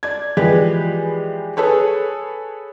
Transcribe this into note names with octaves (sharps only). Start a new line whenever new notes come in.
D5 G#6
E3 F3 G#3 G4 B4 D5
G#4 A4 B4 C#5